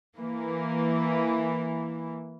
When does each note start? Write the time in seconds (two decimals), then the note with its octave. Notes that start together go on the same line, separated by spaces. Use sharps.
0.16 E3 A#3